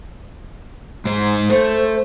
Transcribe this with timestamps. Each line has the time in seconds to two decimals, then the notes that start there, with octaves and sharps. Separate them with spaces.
1.05 G#2 C5
1.50 A3 C5